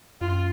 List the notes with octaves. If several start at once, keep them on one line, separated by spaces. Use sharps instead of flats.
F#2 F4